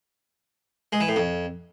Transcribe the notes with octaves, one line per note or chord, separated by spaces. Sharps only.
G#3
E3
A2
F2